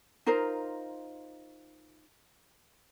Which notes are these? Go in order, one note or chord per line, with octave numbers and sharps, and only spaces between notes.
D#4 F4 A#4 C5